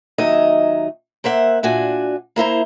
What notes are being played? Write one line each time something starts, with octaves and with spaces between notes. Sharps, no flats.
D#2 F#3 D#4 D#5 E5
A#3 C5 E5 F#5
A#2 D4 F#4 G#5
A#3 E4 C5 A#5